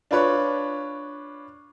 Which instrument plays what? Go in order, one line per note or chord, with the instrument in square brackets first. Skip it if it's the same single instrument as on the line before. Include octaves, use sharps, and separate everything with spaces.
[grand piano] D4 F4 B4 C#5